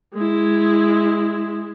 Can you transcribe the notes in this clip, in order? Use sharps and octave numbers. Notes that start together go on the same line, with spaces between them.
G#3 E4